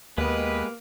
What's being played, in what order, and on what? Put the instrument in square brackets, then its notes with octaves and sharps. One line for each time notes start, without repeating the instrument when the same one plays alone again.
[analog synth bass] D#2 [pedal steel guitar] G#3 D#5 [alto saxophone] A#3 [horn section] B3 G4 B4